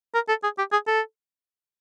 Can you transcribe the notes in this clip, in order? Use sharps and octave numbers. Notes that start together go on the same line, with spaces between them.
A#4
A4
G#4
G4
G#4
A4